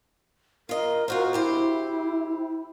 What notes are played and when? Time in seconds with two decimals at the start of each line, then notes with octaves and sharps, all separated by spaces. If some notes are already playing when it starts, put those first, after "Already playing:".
0.69 F4 A#4 D#5
1.08 F4 F#4 C5
1.33 D2 E4 G4 C5